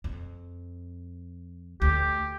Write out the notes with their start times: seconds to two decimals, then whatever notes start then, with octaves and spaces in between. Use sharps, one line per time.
0.04 F2
1.82 D2 G4